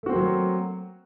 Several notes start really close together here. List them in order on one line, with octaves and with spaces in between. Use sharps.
A3 F#4 C4 A#3 F#3